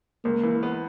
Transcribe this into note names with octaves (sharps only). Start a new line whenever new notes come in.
C#2 A#3
E3
B3